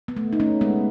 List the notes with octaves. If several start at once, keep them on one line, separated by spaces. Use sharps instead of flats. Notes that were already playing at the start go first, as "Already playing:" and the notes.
B3
A3
D#4
A3 C#4
G#3 B3